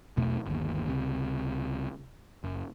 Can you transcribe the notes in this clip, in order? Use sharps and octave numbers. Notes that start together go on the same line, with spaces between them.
B1 E2 B2 A3
G1 D#2
C#2 C3
F#1